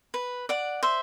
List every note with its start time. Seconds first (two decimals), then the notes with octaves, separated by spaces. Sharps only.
0.14 B4
0.49 D5 F#5
0.83 C5 E5